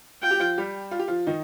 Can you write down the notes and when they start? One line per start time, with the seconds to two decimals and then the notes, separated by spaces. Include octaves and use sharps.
0.22 F4 G5
0.31 G4
0.40 F3 F4
0.58 G3 G4
0.91 F4
0.99 G4
1.08 F3 F4
1.27 D#3 D#4